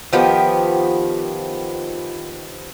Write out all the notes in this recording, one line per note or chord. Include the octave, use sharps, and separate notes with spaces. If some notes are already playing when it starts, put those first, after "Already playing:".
D#3 F3 B3 G4